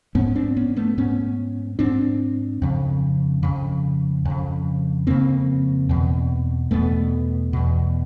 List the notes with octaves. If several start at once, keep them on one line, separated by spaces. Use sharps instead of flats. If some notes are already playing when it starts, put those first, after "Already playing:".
G#2 B3 C#4
C4 D4
B3 C#4
A3 B3
G#2 B3 C#4
G#2 C4 D4
F2 C#3
F2 C#3
F2 C#3
F2 C#3 A#3 C4
E2 B2
E2 B2 A3 B3
E2 B2